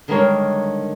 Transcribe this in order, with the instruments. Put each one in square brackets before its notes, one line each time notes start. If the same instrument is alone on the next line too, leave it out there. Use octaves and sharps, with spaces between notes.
[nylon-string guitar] D3 D#3 G3 G#3 A#4 C#5